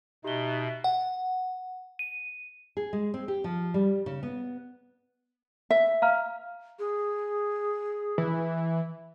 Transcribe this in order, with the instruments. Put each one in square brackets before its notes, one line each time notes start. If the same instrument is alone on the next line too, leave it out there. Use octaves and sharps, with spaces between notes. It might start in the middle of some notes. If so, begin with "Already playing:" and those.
[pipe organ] B2 [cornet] D#4 [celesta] G4 G7 [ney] E5
[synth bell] F#5
D#7
[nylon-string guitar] G#4
G#3
C4
G4
F3
G3
C#3
B3
[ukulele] E5
[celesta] F5 A#5 F6
[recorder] G#4
[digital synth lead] E3